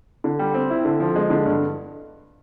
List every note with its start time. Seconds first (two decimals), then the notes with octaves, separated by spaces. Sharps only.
0.24 D3
0.39 G3
0.54 C4
0.70 E4
0.85 D3
1.00 F3
1.16 G#3
1.30 D3
1.45 G2